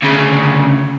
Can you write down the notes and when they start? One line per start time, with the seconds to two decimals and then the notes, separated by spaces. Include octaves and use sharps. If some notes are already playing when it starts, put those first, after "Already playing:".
0.03 D2 C#3